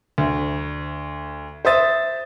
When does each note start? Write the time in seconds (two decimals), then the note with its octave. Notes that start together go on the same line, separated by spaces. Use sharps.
0.18 D2
1.65 C5 E5 D#6 A6